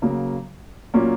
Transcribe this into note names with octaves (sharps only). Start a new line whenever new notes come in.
C#3 F#3 A#3
A#2 F#3 A#3 C#4